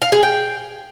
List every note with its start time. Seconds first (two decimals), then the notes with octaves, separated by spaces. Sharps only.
0.02 F5
0.12 G#4
0.23 G5